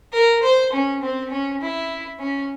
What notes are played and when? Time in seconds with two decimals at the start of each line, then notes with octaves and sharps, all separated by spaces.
0.13 A#4
0.43 C5
0.72 C#4
1.02 C4
1.31 C#4
1.61 E4
2.19 C#4